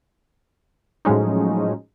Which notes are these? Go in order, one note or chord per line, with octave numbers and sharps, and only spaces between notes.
A2 F3 F#3 G#3 C#4 D#4